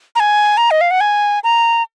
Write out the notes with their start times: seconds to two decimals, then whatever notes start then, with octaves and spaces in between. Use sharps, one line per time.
0.16 A#5
0.20 G#5
0.57 A#5
0.71 D#5
0.81 F5
0.91 F#5
1.01 G#5
1.44 A#5